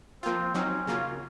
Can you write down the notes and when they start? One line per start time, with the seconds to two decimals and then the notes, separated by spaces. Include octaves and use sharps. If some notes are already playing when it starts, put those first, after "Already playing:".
0.23 F3 A#3 C4 F4
0.55 F#3 C4 C#4 D#4
0.87 C#3 F#3 A#3 F4